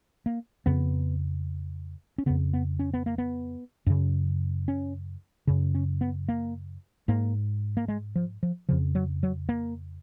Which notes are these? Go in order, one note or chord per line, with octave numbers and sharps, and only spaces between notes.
A#3
F2 C#3 B3
C#4
F2 C#3 B3
B3
C#4
B3
A#3
B3
F#2 C#3
C#4
F#2 C#3
C#4
B3
A#3
G#2 A#3
A#3
G#3
F3
F3
F2 C#3 F3
F#3
F#3
A#3